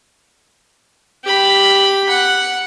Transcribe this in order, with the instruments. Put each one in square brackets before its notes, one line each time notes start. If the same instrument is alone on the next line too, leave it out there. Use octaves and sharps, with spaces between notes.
[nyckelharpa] G4 B5
F#5